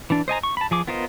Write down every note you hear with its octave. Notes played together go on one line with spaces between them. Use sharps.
E3 D4
C5 D#5 G#5 A#5
C#6
A5 B5
F3 G#4 D6
B3 F4 A#4 C5 D#5